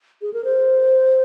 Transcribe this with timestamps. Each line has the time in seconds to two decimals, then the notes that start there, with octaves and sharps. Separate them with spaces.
0.22 G#4
0.34 A#4
0.44 C5